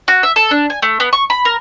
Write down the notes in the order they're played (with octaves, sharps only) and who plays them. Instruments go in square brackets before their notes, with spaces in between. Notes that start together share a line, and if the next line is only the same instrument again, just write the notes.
[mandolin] F#4
E5
A4
D4
G#5
A3
B3
C#6
B5
A#4